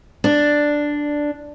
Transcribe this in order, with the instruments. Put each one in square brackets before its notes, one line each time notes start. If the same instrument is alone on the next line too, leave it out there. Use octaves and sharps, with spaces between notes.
[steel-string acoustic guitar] D4